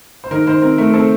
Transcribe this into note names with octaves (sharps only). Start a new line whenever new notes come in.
C5
D#3 A#4
D#3 C5
C4 A#4
A3 A#4
C4 A4